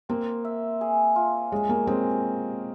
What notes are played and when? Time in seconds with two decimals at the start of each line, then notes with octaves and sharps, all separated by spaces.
0.09 A#3 C4
0.45 E5
0.81 G#4
1.16 F4
1.51 G#3 C#4
1.69 A#3
1.87 G#3 C4 C#4